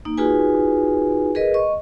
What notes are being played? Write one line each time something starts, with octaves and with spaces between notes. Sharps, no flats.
A#3 D#4
D#4 F4 F#4 G#4 B4 G#5
G#4 A#4 B4 D#5
D#5 C#6